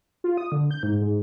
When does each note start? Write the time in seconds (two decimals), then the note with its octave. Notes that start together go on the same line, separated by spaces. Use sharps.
0.24 F4
0.37 D#6
0.52 D3
0.71 G6
0.83 G#2
1.01 G#2